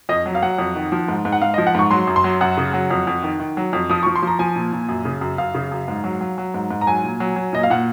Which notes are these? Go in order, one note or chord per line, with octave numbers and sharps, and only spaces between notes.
F2 D#5
F#3
F5
F#3 F#5
F2
D#3
F3
G#2
G#2
F#5
G#2 F5
D#5
F3
F#5
G#2 C#6
F#3 C6
F#2
C6
F#3
F#2 F#5
C#3
F#3
F2
F2
D#3
D#3
F#3
F2
F3 D#6
F3 C#6
C6
F3 A#5
F3 G#5
A#2
A#2
F#2
C#3
F#2
F#2 F5
C#3
F#2
G#2
F#3
F#3
F#3
G#2
G#2
A#5
F#3 G#5
A#2
F#3
F#3
A#2 D#5
F5
A#2 F#5